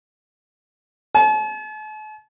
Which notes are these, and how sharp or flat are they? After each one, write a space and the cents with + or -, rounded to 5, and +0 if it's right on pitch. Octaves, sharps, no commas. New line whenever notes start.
A5 -45